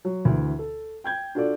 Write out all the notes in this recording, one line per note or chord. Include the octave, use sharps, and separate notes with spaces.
F#3
D2 E3
A4
G5 G6 G#6
D4 F4 F#4 A4 D5